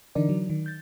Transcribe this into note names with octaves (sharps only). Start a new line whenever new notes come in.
D3 E3 D4 D#4 A#4 D5
F#3
D#3
G6 A6